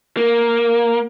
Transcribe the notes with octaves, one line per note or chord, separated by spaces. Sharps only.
A#3